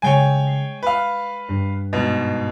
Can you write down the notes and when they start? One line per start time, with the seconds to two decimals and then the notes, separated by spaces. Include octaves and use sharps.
0.02 C#3 G#3 C#5 G5 G#5 C7
0.47 C7 C#7
0.83 B4 F5
1.49 G2
1.93 G#2 B2